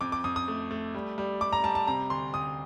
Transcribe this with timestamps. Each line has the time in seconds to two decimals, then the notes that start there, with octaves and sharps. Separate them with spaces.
0.01 F2 D6
0.12 D6
0.24 F2 D#6
0.36 D#6
0.48 A3
0.71 A3
0.94 G3
1.18 G3
1.41 G3 D6
1.53 A#5
1.64 G3 A5
1.75 A5
1.87 C3 A#5
2.10 D2 C6
2.34 D2 D#6